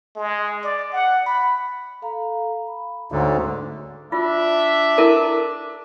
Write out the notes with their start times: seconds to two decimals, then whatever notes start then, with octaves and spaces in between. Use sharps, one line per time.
0.16 G#3
0.64 D5
0.93 F#5
1.27 B5
2.02 A4 F5 A#5
2.67 B5
3.12 D2 G#2 D3 C#5 A#5 C6
4.12 D4 F4 E5
4.98 E4 A4 A#4